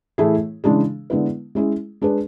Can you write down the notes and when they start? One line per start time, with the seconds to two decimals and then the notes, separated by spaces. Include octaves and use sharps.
0.18 A2 E3 A3 E4 G#4
0.64 C#3 E3 G#3 D4 G#4
1.10 D3 G#3 B3 E4 B4
1.55 G#3 C#4 E4 G#4
2.02 G#3 D4 G#4 B4